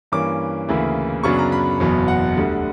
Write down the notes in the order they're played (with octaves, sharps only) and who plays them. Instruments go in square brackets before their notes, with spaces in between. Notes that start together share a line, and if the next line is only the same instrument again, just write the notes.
[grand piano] G2 E3 A#3 C#4 D6
D2 C#3 E3 A#3 E4
F#2 C#3 F#3 B3 D4 C#6
A#5
B5
F#1 E2 B2 F#3 B3
F#5
D2 D3 G3